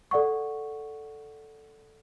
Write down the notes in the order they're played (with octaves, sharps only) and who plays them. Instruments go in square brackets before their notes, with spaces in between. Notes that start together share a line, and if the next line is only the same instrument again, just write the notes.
[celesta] A4 D5 F#5 C#6